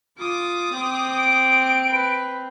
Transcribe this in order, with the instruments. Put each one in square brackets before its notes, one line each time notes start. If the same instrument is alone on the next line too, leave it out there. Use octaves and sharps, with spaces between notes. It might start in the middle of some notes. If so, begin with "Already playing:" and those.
[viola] F4 [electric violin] D6 D#6
[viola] C4
[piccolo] D7
[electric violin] B4